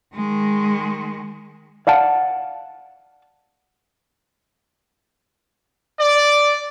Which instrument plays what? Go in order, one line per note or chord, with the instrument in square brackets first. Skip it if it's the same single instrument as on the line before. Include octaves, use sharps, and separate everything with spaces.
[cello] D#3 G#3
[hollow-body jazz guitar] D5 F5 F#5 A5
[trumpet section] D5